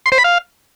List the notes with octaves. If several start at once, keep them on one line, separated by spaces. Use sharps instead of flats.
C6
C5
B5
F5